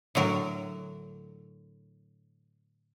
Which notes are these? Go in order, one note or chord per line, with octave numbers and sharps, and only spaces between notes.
A2 D3 F#3 A#4